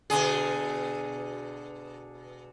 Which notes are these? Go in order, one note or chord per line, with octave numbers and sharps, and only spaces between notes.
B2 D3 G#4